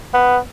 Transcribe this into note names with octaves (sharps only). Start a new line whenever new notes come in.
B3